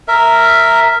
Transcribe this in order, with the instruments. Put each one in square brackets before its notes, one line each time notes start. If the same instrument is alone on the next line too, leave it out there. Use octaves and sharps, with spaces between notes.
[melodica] A#4 E5